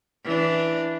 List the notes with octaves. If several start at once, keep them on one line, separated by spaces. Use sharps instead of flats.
E3 D4